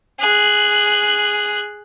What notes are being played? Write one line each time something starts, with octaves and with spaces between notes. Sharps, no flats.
G#4 F#6